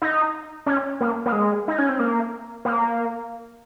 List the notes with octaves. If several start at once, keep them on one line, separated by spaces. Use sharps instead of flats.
D#4
C#4
A#3
A#3
G#3
D#4
C#4
C4
A#3
A#3